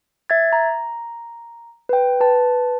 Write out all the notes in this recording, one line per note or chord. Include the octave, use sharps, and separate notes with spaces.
E5 G#6 A6
A#5
B4 G5
B4 A5